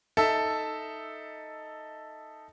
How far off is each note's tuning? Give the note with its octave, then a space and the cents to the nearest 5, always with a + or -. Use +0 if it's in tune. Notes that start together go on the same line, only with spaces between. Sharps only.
D#4 +0 A4 +5 E5 +0